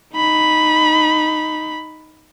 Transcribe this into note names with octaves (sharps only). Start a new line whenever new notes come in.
D#4 B5